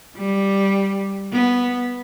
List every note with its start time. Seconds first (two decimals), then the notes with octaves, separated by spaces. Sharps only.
0.17 G3
1.32 B3